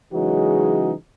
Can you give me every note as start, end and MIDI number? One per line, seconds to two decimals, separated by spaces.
0.12 0.92 49
0.12 0.92 52
0.12 0.92 54
0.12 0.92 56
0.12 0.92 63
0.12 0.92 66